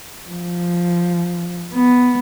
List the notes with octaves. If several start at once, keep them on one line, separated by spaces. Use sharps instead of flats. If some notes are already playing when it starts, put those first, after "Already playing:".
F3
B3